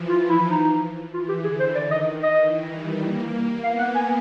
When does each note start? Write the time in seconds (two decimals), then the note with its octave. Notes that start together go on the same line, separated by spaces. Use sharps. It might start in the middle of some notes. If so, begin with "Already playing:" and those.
Already playing: E3 F3
0.09 F4
0.29 E4
0.50 D#4
1.13 E3 F4
1.29 G4
1.44 D3 G#4
1.60 C5
1.75 D#3 D5
1.91 D#5
2.07 D#3
2.23 D#5
2.38 E3
2.69 G3
3.00 A#3
3.63 B3 F5
3.79 F#5
3.95 G#5